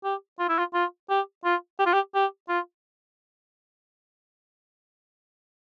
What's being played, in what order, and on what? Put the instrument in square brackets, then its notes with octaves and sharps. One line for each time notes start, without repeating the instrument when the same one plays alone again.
[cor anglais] G4
F4
E4
F4
F4
G4
F4
G4
F4
G4
G4
F4